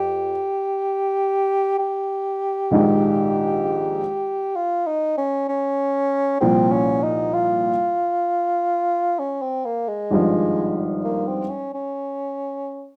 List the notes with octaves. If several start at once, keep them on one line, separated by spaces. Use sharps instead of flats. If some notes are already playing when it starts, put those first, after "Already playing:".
Already playing: F2 G4
G4
A#1 G#2 D#3
F4
D#4
C#4
C#4
C2 A#2 F3 C4
C#4
D#4
F4
C#4
C4
A#3
G#3
G#1 G2 F3
A#3
C4
C#4
C#4